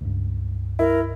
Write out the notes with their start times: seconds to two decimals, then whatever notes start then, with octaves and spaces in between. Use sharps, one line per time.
0.01 C#2 G2
0.79 E4 A#4